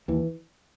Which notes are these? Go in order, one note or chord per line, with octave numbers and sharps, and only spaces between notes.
D#2 E3